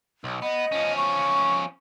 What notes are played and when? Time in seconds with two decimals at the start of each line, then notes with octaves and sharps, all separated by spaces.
0.24 B1
0.42 B3 D#5
0.72 F3 C#4
0.97 C#6